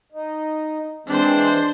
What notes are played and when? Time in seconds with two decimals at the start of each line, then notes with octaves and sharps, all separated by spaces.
0.12 D#4
1.07 E3 G#3 C4 D4 C5